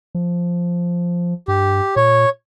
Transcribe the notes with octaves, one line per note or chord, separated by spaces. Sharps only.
F3
G2 G4
A#2 C#5